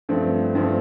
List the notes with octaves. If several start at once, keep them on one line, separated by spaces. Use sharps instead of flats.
G2 F3 A3 C4
G2 F3 A3 C4